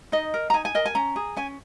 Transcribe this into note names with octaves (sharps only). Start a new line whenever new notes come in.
D#4 D#5
A#4
A#5
D#4 G#5
G#5
A#4 D#5
G#5
C#4 A#5
G#4
C#4 G#5